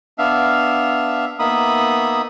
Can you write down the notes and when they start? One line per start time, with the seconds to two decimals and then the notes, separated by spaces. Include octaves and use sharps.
0.18 B3 D4 E5 F5
1.39 A#3 B3 D#4 E5 B5 D#6